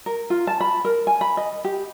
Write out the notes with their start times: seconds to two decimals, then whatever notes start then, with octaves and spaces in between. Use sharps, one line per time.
0.06 A#4
0.30 F4
0.47 A5
0.61 B5
0.85 A#4
1.07 G#5
1.21 B5
1.37 D#5
1.64 G4